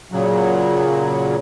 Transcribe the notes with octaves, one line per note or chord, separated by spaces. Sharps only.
A#2 C#3 F#3